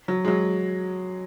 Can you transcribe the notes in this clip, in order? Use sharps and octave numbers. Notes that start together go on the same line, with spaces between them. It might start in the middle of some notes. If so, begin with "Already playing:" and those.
F#3
G#3
F#3